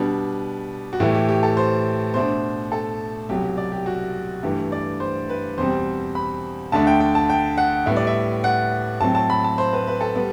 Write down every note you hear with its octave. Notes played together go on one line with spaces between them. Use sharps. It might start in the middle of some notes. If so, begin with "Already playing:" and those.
Already playing: B2 G3 D4 B4
F#4
A2 E3 A3 G4
G4
G4
A4
C5
B2 A3 D4 C5
A4
C2 B2 F#3 G4
D5
G4
F#4
G2 E3 A3 G4
D5
C5
B4
E2 B2 G3 C4 C5
B5
D2 D3 A3 D4 A5
G5
G5
A5
G5
F#5
A2 G3 B3 E5
D5
E5
F#5
A2 F#3 C4 A5
A5
B5
A5
C5
B4
B4
A4
G3 B3